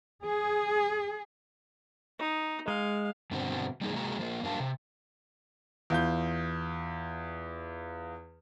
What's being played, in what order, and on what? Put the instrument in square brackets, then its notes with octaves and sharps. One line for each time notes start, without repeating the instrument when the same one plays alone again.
[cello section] G#4
[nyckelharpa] D#4
[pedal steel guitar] G#3 [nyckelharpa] F5
[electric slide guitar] G2 B2 D3 C4 F#4
G3 A#3 D#4 G#4
C3 G#3 A#3 F#4 G#4 A#5
F3 A#3
G2 A#3 D4 F#4 F5 A5
C3
[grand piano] E2 F4 G6